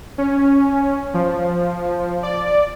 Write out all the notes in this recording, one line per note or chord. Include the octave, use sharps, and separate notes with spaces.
C#4
F3
D5